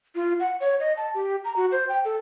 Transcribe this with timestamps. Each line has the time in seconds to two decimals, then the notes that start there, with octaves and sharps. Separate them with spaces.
0.15 F4
0.40 F#5
0.60 C#5
0.80 D#5
0.97 A5
1.14 G4
1.45 A#5
1.56 F#4
1.72 C5
1.89 G5
2.05 A4